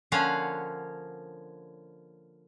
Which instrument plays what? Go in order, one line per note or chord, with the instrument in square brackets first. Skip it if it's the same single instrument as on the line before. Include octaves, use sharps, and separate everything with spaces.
[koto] D3 F3 A#3 C#4 F5 F#5